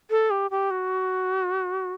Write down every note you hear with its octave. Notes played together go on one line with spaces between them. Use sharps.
A4
G4
G4
F#4